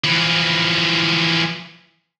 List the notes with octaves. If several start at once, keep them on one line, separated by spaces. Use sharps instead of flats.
E3 F3